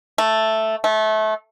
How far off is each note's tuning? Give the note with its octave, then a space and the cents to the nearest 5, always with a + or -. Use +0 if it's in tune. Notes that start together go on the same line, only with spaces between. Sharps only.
A3 +0
A3 -25